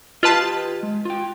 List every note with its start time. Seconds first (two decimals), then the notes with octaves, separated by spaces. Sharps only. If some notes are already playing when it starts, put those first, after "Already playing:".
0.23 F4 G4 B4 D#5 A5
0.83 G#3
1.05 F4 G5